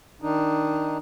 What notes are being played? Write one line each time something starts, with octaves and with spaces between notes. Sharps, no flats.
D#3 D4 D#4